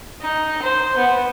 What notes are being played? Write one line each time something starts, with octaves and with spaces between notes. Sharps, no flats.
D#4
C5
B3